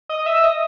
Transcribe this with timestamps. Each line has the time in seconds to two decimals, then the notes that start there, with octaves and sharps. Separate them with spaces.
0.09 D#5
0.26 E5
0.43 D#5